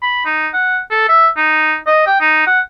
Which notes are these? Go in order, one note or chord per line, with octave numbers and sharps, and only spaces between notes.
B5
D#4
F#5
A4
E5
D#4
D#5
G5
D#4
F#5